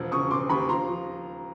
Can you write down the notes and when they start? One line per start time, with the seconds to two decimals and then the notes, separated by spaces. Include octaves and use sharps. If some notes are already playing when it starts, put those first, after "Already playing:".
Already playing: E1 F3
0.12 C#3 C#6 D#6
0.31 E1 C6 D6
0.49 D#2 B5 C#6
0.69 F3 A#5 C6
0.89 F3